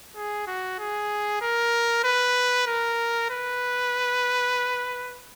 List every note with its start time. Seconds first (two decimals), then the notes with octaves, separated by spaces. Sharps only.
0.16 G#4
0.47 F#4
0.79 G#4
1.41 A#4
2.04 B4
2.67 A#4
3.30 B4